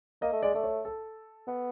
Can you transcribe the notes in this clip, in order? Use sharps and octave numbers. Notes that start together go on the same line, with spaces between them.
A#3 D#5
A3
G#3 D5
A3 D5
C#5
A4
B3